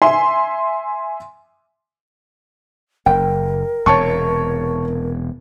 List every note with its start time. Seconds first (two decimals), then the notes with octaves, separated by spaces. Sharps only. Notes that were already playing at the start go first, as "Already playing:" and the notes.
0.02 E5 G#5 C6
3.06 F#1 A#4 G5
3.86 E1 E2 C3 C#5 A5 C#6